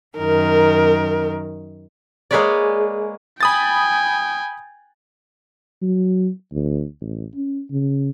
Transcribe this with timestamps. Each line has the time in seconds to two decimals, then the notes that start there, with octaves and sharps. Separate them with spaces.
0.17 F#2 D#3 A#4
2.31 G#3 A#3 G#4 B4 C#5 D5
3.41 G5 G#5 B5 D#6 A6
5.82 F#3
6.52 D2
7.01 A1
7.35 C#4
7.70 C#3